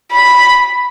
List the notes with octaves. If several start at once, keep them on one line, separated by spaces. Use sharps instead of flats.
B5